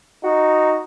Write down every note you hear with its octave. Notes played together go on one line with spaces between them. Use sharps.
D#4 F#4